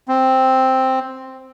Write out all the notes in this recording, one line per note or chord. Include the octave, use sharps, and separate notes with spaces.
C4